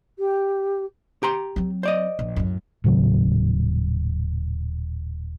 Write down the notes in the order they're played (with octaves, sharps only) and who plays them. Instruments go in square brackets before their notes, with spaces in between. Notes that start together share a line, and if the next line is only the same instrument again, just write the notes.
[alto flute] G4
[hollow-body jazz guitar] G4 A#5 C6
[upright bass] F#3 C4
[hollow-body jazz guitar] C5 D5 D#5
[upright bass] A#1
F#2 A2
[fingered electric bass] D#1 A2 C#3 F#3